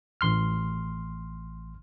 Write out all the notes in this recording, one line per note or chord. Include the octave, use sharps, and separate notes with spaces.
A1 C6 F6